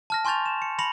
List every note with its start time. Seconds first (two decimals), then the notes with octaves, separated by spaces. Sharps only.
0.10 A5 F6 A#6
0.25 G#5 C6 C#6 G6 A6 F7
0.46 E7
0.62 C#7
0.79 B5 A#6 C#7 F7 F#7